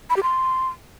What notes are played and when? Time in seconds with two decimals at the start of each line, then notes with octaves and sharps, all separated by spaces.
0.10 B5
0.16 G4
0.23 C6